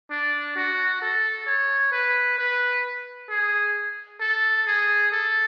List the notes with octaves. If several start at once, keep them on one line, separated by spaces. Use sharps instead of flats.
D4
F#4
A4
C#5
B4
B4
G#4
A4
G#4
A4